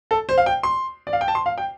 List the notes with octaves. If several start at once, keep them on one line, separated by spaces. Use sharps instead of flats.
A4
C5
F5
G5
C6
D5
F5
G5
A5
C6
F5
G5